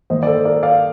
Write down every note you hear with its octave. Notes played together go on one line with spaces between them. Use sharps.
D#3 A#3 C5 D#5
D5
A4 C5
A#4 D5
D5 F5